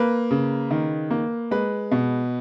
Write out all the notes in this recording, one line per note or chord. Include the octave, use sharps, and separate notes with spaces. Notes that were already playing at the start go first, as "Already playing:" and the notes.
Already playing: A#3 B4
C#3
D#3
A#3
G#3 B4
B2